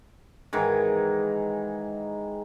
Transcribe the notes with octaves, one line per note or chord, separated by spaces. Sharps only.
G#2 D#3 E3